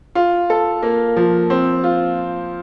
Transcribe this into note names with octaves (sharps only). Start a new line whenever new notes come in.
F4
A4
A#3
F3
C4
F4